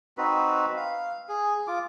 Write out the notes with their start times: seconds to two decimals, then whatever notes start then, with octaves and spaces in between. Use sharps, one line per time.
0.18 C4 D#4 F#4 B4
0.77 F5
1.29 G#4
1.67 F4 D6